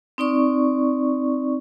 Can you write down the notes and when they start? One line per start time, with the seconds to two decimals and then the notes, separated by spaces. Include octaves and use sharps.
0.18 C4 D#4 D5 C#6